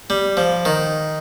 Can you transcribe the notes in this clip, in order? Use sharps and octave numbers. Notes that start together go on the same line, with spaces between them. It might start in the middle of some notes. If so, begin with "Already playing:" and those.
G3
F3
D#3